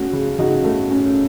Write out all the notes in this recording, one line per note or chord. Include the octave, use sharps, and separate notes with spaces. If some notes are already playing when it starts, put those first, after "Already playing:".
Already playing: A3 C#4 F#4
C#3
C#3 D#4 F#4
A3
C#4